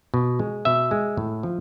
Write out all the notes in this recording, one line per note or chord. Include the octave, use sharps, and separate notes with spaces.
B2
G#3
B2 E5
G#3
A2
F3